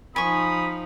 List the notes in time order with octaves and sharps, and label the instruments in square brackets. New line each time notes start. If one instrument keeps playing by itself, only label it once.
[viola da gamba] F3 D#4 [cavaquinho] G#5 C#6 [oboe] B5 [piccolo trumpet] D#6